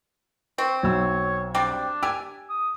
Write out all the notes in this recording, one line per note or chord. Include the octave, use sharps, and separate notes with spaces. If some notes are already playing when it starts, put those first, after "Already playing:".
C4 C#6
B1 C#5 E6
G3 C4 D4 D5
G4 G#5 E6
D#6